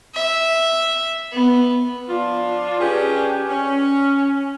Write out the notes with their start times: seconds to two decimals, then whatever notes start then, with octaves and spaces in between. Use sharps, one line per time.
0.15 E5
1.33 B3
2.08 F3 D4 F4
2.79 C#4 D4 G4 G#4 B4
3.49 C#4